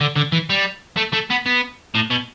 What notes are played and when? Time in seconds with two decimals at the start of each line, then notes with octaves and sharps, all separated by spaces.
0.01 D3
0.16 D3
0.32 E3
0.50 G3
0.97 A3
1.13 A3
1.31 B3
1.46 B3
1.95 A2
2.11 B2